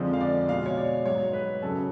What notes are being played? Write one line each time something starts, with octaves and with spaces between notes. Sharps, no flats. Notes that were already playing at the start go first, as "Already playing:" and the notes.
Already playing: F2 D3 F3 G#3
F5
D5
B2 G#3 F5
C#5
D5
G#2 F#3 C#5
B4
F#2 C#3 F#3 A4